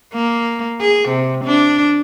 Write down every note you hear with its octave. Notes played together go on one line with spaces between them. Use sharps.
A#3
G#4
C3
D4